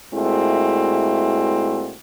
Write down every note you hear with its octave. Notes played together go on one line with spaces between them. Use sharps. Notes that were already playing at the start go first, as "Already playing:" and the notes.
A#2 G#3 A3 C4 E4 F#4